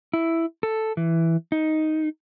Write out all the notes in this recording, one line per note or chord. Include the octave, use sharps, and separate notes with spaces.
E4
A4
E3
D#4